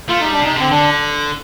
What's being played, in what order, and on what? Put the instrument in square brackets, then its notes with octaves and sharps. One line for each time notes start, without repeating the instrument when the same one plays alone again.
[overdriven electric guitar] A3 [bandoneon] F4
[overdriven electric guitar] G3 [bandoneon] D#4
[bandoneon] D4
[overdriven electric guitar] C3 [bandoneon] D#4
[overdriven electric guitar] D3 [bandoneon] C4
[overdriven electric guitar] D3 [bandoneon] D4